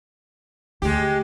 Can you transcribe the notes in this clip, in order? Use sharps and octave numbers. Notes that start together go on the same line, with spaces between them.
D2 G#3 G4